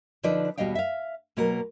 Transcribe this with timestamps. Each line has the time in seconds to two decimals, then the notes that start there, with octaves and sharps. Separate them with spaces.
0.23 D3 F3 D4 D#4 B4 D5
0.58 D#2 B2 G3 D#5 F5 G5
0.75 E5 F5
1.37 B2 F#3 A#3 B3 A#4